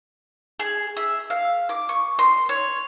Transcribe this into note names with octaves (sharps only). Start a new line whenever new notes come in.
G#4
E5
F5
D6
C#6
C6
C#5